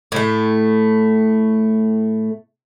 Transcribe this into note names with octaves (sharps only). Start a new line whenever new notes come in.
A2 A3